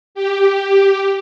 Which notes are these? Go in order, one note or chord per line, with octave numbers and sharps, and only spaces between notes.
G4